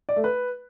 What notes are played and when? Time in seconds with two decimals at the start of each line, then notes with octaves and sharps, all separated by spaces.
0.09 D5
0.16 A3
0.24 B4